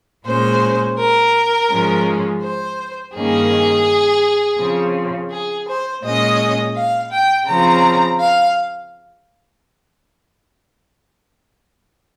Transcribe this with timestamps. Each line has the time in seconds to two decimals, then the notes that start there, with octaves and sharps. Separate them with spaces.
0.25 A#2 G#3 C#4 C5
0.98 A#4
1.70 G#2 F3 G#3 C#4
2.41 C5
3.14 G2 D#3 A#3 C#4 G#4
4.58 C#3 F3 C4
5.30 G#4
5.67 C5
6.03 A#2 G#3 C#4 D#5
6.75 F5
7.11 G5
7.46 C#3 F3 C4 A#5
8.20 F5